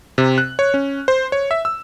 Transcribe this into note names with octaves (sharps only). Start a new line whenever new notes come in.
C3
F#6
C#5
C#4
C5
C#5
E5
E6